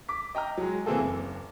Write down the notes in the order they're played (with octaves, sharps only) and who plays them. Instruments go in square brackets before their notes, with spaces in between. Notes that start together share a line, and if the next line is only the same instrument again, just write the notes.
[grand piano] D6 B6
D#5 G5 A#5 F6
F#3 G#3
E3 A#3 C4 G#4 A4
F#1